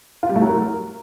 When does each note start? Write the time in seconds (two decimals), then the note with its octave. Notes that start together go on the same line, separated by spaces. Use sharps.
0.23 F4
0.29 G3
0.36 A3
0.42 F#3
0.48 A#4